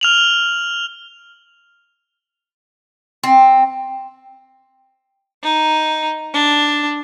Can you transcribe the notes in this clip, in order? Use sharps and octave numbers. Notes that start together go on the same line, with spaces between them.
F6 F7 F#7
C4
D#4
D4